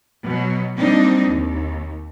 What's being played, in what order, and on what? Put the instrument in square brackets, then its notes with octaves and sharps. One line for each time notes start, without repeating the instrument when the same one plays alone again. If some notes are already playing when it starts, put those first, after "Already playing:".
[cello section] B2 F#3
G3 A#3 C4 D4 D#4
D#2